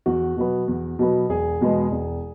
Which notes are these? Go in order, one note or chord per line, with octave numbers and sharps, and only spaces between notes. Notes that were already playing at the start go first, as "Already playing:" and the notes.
E2 F#4
B2 F#3 B3
E2
B2 F#3 B3
E1 G#4
E2 B2 G#3 B3
E1